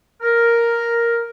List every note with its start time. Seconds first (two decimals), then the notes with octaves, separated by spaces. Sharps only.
0.22 A#4